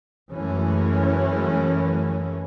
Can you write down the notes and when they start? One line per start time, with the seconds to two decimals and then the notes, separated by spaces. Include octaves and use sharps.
0.32 F#2 E3 G#3 A3 C#4